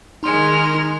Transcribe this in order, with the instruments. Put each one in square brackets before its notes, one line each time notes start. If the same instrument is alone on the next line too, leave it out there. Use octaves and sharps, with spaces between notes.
[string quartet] D#3 G#3 F6 [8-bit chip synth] D#4 C6